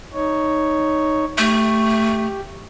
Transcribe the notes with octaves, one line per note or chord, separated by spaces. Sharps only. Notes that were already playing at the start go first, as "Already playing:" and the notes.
D#4 C#5
A3 G4